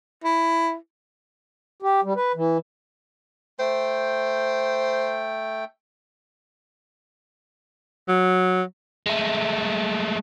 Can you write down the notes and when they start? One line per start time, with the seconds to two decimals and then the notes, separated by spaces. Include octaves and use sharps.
0.24 E4
1.82 G4
2.04 G3
2.16 B4
2.35 E3
3.59 A3 C5 G5
8.08 F#3
9.06 G#3 A3